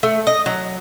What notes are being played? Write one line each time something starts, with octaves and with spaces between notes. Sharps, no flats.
A3
D#5
F#3